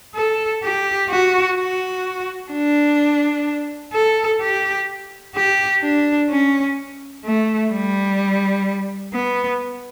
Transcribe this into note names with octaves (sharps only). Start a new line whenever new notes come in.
A4
G4
F#4
F#4
D4
A4
G4
G4
D4
C#4
A3
G3
B3